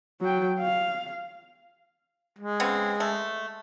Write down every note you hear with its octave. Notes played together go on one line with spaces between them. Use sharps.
F#3 G5
F5
G#3
C#3 B3 C4
A3